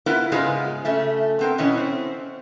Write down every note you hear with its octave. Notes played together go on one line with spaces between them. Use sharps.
B3 E4 F4 A#4 B4
G#2 C#3 G#3 B3 F4 G#4
C#3 A3 E5
B3 C4 A#4
B2 E3 B3 C#4
C4